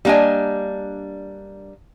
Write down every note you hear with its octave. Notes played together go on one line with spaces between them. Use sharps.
G3 A#3 D4 D#5 G#5